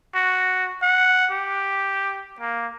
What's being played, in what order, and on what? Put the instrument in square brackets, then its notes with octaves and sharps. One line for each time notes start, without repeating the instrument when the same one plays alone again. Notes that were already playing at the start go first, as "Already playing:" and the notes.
[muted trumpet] F#4
F#5
G4
A#3